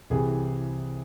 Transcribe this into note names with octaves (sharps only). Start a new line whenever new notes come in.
C2 C3 E3 G#4